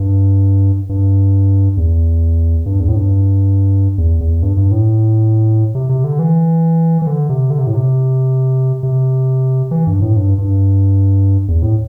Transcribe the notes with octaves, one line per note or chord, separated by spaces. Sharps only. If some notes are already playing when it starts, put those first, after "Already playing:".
Already playing: G2
G2
E2
G2
E2
A2
G2
E2
E2
G2
G2
A2
C3
C3
D3
E3
E3
D3
C3
D3
C3
A2
C3
C3
E3
G2
A2
G2
G2
E2
A2